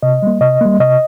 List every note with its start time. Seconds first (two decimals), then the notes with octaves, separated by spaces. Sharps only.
0.03 C3 D#5
0.22 G3 A#3
0.41 C3 D#5
0.61 G3 A#3
0.80 C3 D#5